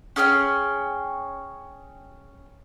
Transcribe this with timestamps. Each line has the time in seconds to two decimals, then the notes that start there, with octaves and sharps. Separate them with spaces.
0.16 C#4 G#4 G5 F6